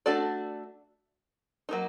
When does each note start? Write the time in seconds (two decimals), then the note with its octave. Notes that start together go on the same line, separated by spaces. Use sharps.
0.06 A3 D4 F#4 A4 D5
1.69 F#3 A#3 D#4